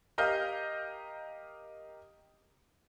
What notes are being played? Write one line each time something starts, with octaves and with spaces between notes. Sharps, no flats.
G4 A#4 D#5 F5 G6